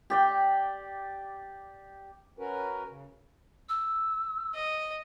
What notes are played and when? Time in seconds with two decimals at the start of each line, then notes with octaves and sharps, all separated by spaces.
0.10 G4 D5 G5
2.39 C#4 F#4 A#4 B4
2.89 C#3
3.69 E6
4.55 D#5